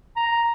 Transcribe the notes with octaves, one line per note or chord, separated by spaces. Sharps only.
A#5